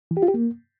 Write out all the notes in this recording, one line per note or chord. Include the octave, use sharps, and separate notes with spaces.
E3
G4
F4
G4
A#3